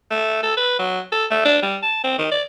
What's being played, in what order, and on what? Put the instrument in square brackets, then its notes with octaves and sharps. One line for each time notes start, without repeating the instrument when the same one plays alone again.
[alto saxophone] A3
A4
B4
F#3
A4
A3
D4
G3
A5
C4
D#3
D5